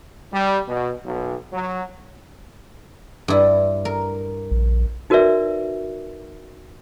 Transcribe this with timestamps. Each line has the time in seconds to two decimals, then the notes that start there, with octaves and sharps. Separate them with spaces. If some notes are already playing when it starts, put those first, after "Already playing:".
0.32 G3
0.67 B2
1.06 B1
1.52 F#3
3.28 G2 E4
3.85 A#4
4.51 A#1
5.10 D#4 F#4 A#4 B4 D5 E5